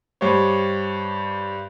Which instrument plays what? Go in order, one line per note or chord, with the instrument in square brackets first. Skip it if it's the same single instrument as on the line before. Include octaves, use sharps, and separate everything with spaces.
[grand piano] G2 G4 C5 C#5